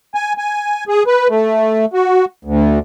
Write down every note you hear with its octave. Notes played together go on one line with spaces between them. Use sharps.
G#5
G#5
G#4
B4
A3
F#4
D2